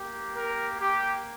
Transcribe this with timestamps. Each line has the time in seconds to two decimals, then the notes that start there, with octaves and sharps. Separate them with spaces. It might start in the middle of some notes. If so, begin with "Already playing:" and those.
Already playing: A#3 G4
0.36 A#4
0.80 G4